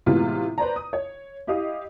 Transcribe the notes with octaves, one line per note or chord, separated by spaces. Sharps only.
A2 C3 E3 G#3 B3 F4
B4 C5 D5 A#5
D#6
C#5
E4 G4 D#5 F5 D#6